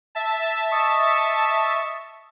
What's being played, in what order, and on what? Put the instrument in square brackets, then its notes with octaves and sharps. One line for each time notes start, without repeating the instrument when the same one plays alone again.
[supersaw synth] E5 A5
[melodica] D#5 C#6